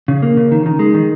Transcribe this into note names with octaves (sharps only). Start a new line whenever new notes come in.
C#3
A#3
C#3
D#3
D#3
G#3
D#3